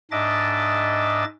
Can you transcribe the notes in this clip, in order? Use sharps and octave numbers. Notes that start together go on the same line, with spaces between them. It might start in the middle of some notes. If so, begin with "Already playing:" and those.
G#2 D4 D#5 E5 D6 A6